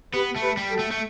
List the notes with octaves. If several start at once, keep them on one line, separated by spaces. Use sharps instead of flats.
B3 G4 B4
A3
G4 B4
G3
F#4 A4
A3
A3